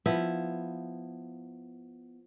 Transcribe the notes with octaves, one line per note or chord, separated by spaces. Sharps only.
F3 B3 E4